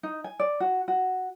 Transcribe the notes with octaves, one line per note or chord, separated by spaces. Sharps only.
D#4
G#5
D5
F#4
F#4